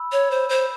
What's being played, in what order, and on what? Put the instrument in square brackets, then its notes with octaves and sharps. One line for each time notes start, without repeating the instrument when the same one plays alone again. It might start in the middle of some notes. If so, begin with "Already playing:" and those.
Already playing: [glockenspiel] B5 E6
[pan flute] C#5
C5
C5